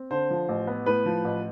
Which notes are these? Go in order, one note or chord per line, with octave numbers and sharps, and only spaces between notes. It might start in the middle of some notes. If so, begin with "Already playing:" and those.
Already playing: C4
D3 C5
F3
A1
B3
A2 B4
F3
A1